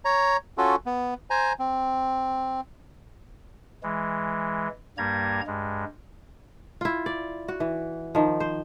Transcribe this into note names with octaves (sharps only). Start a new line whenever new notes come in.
C#5 A#5
C#4 F4 F#4 A4
B3
C5 G#5 A#5
C4
E3 G#3
G2 G3 A#3 A#5 G#6
G2 G#3
E4 F4
D5
F#4
E3
D#3 F3
C5